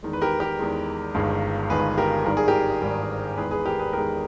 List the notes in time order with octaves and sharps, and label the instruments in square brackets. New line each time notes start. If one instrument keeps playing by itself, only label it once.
[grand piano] E2 D#3 G#3
B4
G4 A#4
G4 A#4
E2 D#3 G#3
G1 G2 D#3 G#3
G1 G2 D#3 G#3 G#4 B4
G4 A#4
G#1 G#2 D#3 G3 A#4
G#4
G4 A#4
G#1 G#2 D#3 G3
E2 D#3 G#3 G#4 B4
G#4 B4
G4 A#4
G#4 B4
E2 D#3 G#3 G4 A#4